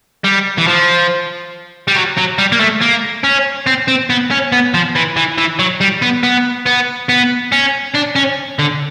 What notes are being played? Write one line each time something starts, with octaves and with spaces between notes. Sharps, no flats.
G3
E3
F3
G3
F#3
F#3
G3
A#3
A3
A#3
C#4
C4
C4
B3
C#4
B3
F3
E3
E3
E3
F#3
G3
B3
B3
B3
B3
C#4
D4
C#4
D3